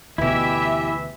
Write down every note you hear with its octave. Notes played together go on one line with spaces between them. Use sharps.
D2 B2 E3 E4 G4 E5